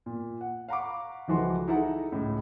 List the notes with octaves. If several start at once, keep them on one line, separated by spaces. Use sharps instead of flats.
A#2
F#5
F5 F#5 A#5 B5 C#6 D6
C#2 E3 F3 F#4 A4 C6
D#4 E4 G#4 A4 F#5 A#5
C#2 A2 C#3